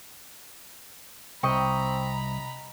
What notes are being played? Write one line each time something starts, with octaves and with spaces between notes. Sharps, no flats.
C2 C4 D#5 G5 A#5 B5 C#6